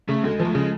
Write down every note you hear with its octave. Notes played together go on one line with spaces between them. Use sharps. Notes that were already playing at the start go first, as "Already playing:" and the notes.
C#3 A3
D2 G#3
F3 A3
C#3 G#3